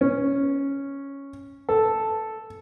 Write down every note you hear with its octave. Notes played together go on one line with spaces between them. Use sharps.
C#4
A4